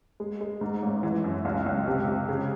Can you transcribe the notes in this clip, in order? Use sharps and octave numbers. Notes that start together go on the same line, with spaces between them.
G#3
G#3
G#2
A1
E3
F#2
C#2
C#2
C3
C3
C#3